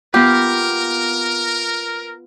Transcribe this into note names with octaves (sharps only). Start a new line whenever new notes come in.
B3 F4 G4 A#4